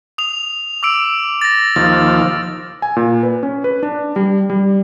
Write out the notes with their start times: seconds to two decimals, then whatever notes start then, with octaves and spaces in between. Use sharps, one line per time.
0.18 D#6 F7
0.83 D6 E6 D7
1.41 A6 A#6
1.76 D#2 F3 A6
2.82 G#5
2.96 A#2
3.23 B4
3.43 C#4
3.64 B4
3.83 D4
4.16 G3
4.50 G3